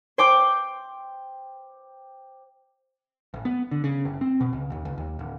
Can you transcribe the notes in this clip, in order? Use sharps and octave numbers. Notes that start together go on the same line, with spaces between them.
C5 G5 D6
A1
B3
D3
C#3
F#1
C4
B2
C#2
D#2
C#2
D#2
D1